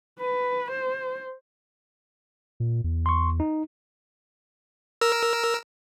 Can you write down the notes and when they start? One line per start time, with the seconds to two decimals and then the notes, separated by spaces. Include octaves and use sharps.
0.20 B4
0.71 C5
2.60 A#2
2.84 E2
3.06 C6 C#6
3.40 D#4
5.01 A#4 E6